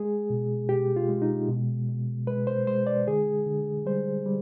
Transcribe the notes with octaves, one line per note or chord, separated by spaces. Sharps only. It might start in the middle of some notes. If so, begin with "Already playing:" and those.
Already playing: G#3 G#4
B2
B2 G4
F4
G#3
D#4
B2
B2
G#3 B4
C5
G#3 C5
D5
D3 G#4
D3
G3 C5
G3